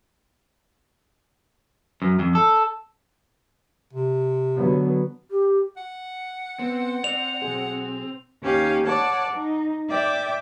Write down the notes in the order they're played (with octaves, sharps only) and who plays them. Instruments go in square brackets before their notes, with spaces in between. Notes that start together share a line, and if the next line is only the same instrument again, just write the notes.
[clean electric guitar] F#2
F2
A4
[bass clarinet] C3
[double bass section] D3 F#3 B3
[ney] G4
[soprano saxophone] F#5
[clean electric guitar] B3 [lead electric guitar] C4
[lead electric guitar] C4 [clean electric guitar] D5 [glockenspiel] F7
[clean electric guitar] B1 E2 G#4
[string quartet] D#2 C#4 G4 F5
C#5 D5 F#5 A5
D#4
D5 E5 G5 D6